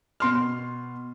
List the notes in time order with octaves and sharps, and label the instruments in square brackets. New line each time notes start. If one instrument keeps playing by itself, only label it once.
[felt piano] B2 C6 F6